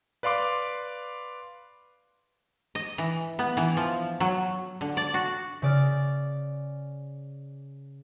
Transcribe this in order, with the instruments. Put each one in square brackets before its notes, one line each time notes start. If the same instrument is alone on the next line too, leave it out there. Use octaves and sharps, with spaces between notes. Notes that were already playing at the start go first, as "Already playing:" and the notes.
[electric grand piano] B4 D5 F5 C6 D6
[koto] D#5
E3
B3
E3
F3
F#3
D3
D5
F#4
[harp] C#3 D5 F6